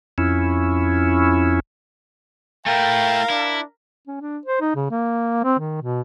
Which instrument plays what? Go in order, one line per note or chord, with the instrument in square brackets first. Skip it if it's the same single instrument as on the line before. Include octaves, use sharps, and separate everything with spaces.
[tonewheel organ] F2 C#4 E4
[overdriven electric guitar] A3 E4 [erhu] A#4 [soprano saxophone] F5 [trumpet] G5
[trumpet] D4 [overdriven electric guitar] E4
[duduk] C#4
D4
C5
D#4
C#3
A#3
C4
D#3
B2